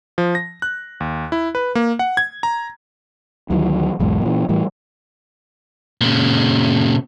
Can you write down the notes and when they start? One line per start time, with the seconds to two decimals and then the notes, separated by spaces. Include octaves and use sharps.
0.18 F3
0.35 A#6
0.62 F#6
1.00 D#2
1.32 E4
1.55 B4
1.75 A#3
1.99 F#5
2.17 G#6
2.43 A#5
3.50 D2 D#3 E3 F#3
3.99 B1 E2 G#2 G#3
4.22 A#2 E3
4.49 A2 E3 G3
6.01 A#2 C#3